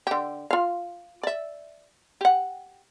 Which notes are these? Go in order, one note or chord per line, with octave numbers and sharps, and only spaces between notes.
D3 G4
F4 F5
D5 E5
G4 F#5